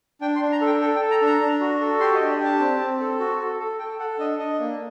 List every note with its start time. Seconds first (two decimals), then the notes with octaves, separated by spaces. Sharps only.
0.21 D4 G5
0.36 C6
0.42 D4
0.52 A#5
0.61 A4 G5
0.81 A4 G5
0.96 G5
1.01 A4
1.11 A#5
1.21 D4 A#5
1.41 D4
1.61 F#4
1.80 A4
2.00 G4 C6
2.15 D#5
2.20 D4
2.30 D5
2.40 G4
2.45 A5
2.60 C4
2.81 C4
3.00 A4
3.20 F#4
3.40 A4
3.59 A4
3.79 A4 G5
3.99 A4 F#5
4.19 D4 D#5
4.39 D4 D#5
4.59 A#3